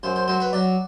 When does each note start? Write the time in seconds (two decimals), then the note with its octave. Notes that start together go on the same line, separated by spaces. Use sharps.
0.03 F#2 C5
0.16 C5
0.28 F#3 C5
0.40 B4
0.53 F#3 D5